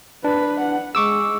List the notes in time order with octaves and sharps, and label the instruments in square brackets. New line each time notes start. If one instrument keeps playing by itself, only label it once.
[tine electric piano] D4 [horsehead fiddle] B4
[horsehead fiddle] F#5
[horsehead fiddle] G#3 [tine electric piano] C#6 D6 E6